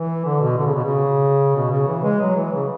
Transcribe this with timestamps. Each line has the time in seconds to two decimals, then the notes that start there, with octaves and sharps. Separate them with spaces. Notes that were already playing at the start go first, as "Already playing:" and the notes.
Already playing: E3
0.25 D3
0.41 B2
0.58 D3
0.66 C#3
0.76 B2
0.85 C#3
1.55 B2
1.71 C#3
1.88 E3
2.04 G#3
2.21 F#3
2.36 E3
2.53 C#3